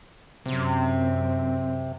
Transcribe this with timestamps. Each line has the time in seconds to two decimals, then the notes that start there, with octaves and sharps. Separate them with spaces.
0.46 F#2 C3 C4